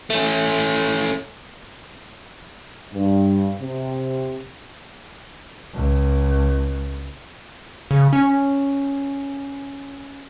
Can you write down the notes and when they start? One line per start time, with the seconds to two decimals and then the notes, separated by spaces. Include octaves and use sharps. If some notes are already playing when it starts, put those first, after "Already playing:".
0.10 A3 C#4
2.93 G2
3.60 C3
5.74 C#2
7.91 C#3
8.13 C#4